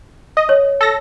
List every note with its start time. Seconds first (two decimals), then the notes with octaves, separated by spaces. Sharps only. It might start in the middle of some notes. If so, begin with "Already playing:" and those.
0.37 D#5
0.49 C#5
0.81 A4 A#6